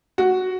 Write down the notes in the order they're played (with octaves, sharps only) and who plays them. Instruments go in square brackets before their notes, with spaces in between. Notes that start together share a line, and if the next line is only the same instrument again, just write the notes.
[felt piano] F#4